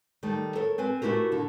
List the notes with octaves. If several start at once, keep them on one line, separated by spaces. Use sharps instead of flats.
D#3 G3 A3
A4 A#4 C#5
C4 B4 G#5
A3 E4 F#4 G4 A#4
D3